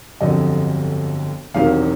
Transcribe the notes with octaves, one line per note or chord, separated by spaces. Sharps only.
G1 F2 D3 F#3 D#5
E1 E2 C3 D#3 F#3 F5